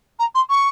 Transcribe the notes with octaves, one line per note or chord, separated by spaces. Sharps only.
A#5
C6
C#6